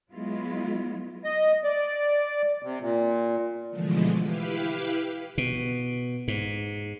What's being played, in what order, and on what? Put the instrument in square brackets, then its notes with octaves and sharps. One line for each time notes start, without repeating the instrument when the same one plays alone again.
[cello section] F#3 G#3 B3 E4 F4
[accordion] D#5
D5
C3
A#2
[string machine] B2 D3 E3 F3 G#3 A3
E4 G4 B4 F5
[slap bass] B2
G#2